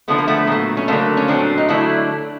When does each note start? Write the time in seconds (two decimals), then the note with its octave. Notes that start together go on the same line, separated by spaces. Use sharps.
0.08 D3 F3 A3 B3
0.18 A#3
0.28 A3 B3
0.47 A#2 F#3 A3
0.77 C#4
0.88 D3 F#3 A3 A#3 C4
1.17 C#4
1.28 A#2 F#3 A3 C4 D4
1.58 D#4
1.69 D3 F#3 A3 D4 E4